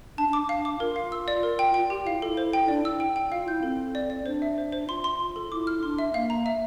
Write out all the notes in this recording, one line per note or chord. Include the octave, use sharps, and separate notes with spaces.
D4 A5
D4 D6
D4 F5
D6
F4 A#4
F5
E6
D5
A#4
G5
F4 G5
G4
E4 F5
F4
E4 A4
C5
G5
D4 D5
E4 E6
G5
G5
F4 F5
E4 G6
C4 A4
A4
D5
D5
D4 C5
E5
C5
C5
F4 C6
C6
C6
A4
E4 D6
F6
D4 C6
E5
A#3 F5
A#5
E5